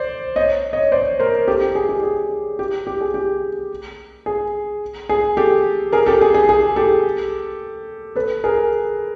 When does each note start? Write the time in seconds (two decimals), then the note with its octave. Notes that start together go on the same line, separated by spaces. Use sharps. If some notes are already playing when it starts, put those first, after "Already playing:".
Already playing: C5 D5
0.36 C#5 D#5
0.73 C#5 D#5
0.92 C5 D5
1.20 A#4 C5
1.48 G4 A4
1.61 G4
1.75 G#4
1.89 G4
2.03 G#4
2.59 G4
2.87 G4
3.01 G#4
3.14 G4
4.26 G#4
5.09 G#4
5.37 G4 A4
5.92 G#4 A#4
6.06 G4 A4
6.21 G#4
6.34 G#4
6.49 G#4
6.76 G4 A4
8.16 A4 B4
8.44 G#4 A#4